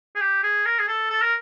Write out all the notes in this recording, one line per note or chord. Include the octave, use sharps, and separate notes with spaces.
G#4
G4
G#4
A#4
G#4
A4
A4
A#4